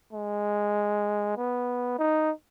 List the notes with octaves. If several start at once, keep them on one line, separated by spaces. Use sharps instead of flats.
G#3
B3
D#4